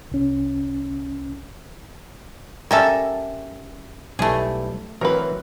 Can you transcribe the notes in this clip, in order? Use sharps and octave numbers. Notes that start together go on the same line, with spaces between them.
C2 C#4
G3 C#4 A4 A#4 E5
B1 G3 A3 E4 G#4
E3 F#3 C4 A#4 B4